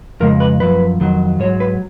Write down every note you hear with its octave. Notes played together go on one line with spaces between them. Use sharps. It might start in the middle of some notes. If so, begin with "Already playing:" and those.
F2 C#3 G#3 A#4
B4
F#2 F3 B4
F2 D#3 F#3
G#2 F#3 C#5
B4